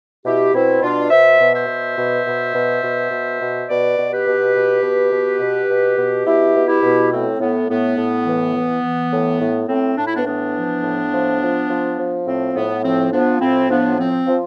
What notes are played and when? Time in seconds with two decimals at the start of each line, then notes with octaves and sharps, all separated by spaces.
0.25 B2 E4 G4
0.53 B2 C4 E4
0.82 B2 D4 F4
1.10 B2 C5 E5
1.39 B2
1.53 C5 E5
1.67 B2
1.96 B2
2.25 B2
2.54 B2
2.82 B2
3.10 B2
3.40 B2
3.68 B2 B4 D5
3.97 B2
4.11 G4 B4
4.26 B2
4.54 B2
4.82 B2
5.11 B2
5.39 B2
5.69 B2
5.97 B2
6.25 B2 E4 G4
6.55 B2
6.68 E4 G4
6.82 B2
7.11 A2 C4
7.40 A2 B3
7.68 A2 B3
7.98 A2
8.26 E3
8.55 E3
8.83 E3
9.11 A2
9.40 A2
9.68 A2 C4
9.97 A2 D4
10.06 E4
10.15 B3 D4
10.25 E3 B3 D4
10.55 F3
10.83 A2
11.12 F3
11.41 F3
11.69 F3
11.98 F3
12.26 A2 C4
12.54 A2 B3
12.83 F3 C4
13.11 F3 B3 D4
13.40 A2 C4 E4
13.69 F3 B3 D4
13.98 F3 C4
14.26 F3